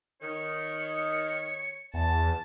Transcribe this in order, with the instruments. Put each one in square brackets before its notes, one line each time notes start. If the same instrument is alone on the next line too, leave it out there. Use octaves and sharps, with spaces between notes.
[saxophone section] D#3 [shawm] C#5
[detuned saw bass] E2 [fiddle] A5